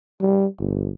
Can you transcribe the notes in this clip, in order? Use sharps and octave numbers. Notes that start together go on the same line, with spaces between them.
G3
G1